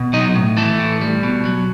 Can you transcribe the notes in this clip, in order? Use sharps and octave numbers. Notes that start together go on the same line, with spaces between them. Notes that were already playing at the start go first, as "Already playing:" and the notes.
Already playing: B2
F#3 D#4 D#5
A2
E3 A3 A4
A2
G3
B2
F#3